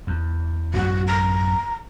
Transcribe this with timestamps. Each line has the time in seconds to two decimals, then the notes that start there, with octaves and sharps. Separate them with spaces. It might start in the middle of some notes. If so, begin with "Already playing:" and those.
0.07 E2
0.74 A1 F#2 G#3 F#4
1.07 A#5